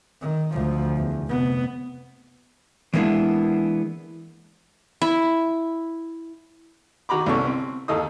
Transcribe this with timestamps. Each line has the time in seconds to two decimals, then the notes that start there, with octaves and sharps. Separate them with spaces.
0.21 D#3
0.53 D2 F3
0.97 E2
1.28 F1 B3
2.94 E3 G#3 A#3 B3 D4 E4
5.02 E4
7.09 D#3 F#4 A#5 B5 D6
7.26 C2 B3 C#4 A4 C#6
7.46 C4
7.88 D#2 D#3 A4 D#5 D#6